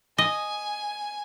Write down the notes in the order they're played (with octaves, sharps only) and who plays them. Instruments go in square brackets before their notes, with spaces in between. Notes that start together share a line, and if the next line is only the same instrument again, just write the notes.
[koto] D#5 [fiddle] G#5